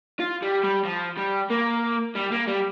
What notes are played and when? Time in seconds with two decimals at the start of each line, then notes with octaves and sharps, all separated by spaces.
0.20 F4
0.43 G3
0.64 G3
0.85 F3
1.17 G3
1.50 A#3
2.15 G3
2.31 A#3
2.47 G3